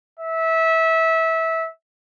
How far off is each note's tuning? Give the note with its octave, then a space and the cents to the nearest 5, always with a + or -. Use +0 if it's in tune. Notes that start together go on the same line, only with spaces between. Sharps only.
E5 -20